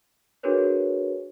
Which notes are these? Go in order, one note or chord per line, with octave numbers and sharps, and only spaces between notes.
D4 F#4 G#4 A#4 B4 C#5